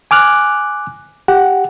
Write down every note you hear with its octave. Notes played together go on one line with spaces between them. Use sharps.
G#5 D6 F6 F#6
G4 F#5